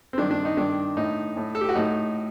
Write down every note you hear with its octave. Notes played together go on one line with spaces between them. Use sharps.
C4
G2 D#3 D4
D4
D#4
G2 D#3 D4
A2 D#4
A2
A4
G4
F#4
A2 D#4